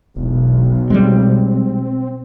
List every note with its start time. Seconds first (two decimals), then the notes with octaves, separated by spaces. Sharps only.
0.16 E1 B1
0.90 G3 G#3 C4